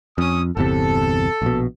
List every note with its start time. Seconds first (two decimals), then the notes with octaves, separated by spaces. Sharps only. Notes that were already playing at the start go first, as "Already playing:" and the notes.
0.18 F2 C#4 D#6
0.57 G1 E2 C3 A4
1.42 A#1 B2